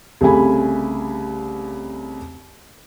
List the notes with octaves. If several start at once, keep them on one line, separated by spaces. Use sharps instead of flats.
C2 C#3 A3 G#5 B5